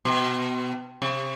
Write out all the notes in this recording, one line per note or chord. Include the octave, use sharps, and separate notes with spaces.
B2
C3